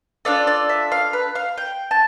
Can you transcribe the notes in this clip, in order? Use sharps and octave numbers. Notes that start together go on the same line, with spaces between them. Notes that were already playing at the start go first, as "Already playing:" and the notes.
D4 F4 A4 D5
D5
E5
F5
B4
F5
G5
A5